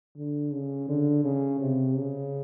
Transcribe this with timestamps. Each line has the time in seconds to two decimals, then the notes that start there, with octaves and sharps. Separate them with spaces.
0.17 D3
0.53 C#3
0.89 D3
1.24 C#3
1.60 C3
1.96 C#3